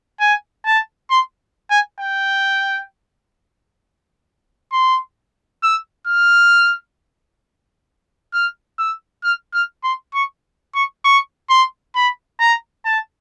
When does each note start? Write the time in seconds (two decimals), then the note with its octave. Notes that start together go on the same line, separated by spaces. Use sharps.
0.20 G#5
0.65 A5
1.10 C6
1.71 G#5
2.01 G5
4.72 C6
5.63 E6
6.07 F6
8.33 F6
8.79 E6
9.24 F6
9.54 F6
9.84 C6
10.14 C#6
10.75 C#6
11.05 C#6
11.50 C6
11.95 B5
12.40 A#5
12.85 A5